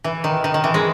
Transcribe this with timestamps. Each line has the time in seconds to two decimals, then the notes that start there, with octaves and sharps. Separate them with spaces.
0.04 E3
0.24 D#3
0.44 D#3
0.54 D#3
0.64 E3
0.74 G#3